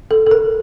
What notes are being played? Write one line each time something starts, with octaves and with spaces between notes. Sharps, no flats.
A4
A4
A#4